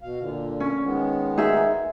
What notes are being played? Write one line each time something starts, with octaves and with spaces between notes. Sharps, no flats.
B2 F5
A#2 D3
C#4
D#3 G#3 B3
D#4 G#4 E5